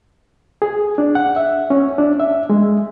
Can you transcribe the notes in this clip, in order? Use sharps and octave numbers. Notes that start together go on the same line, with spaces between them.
G#4
D4
F#5
E5
C#4
D4
E5
G#3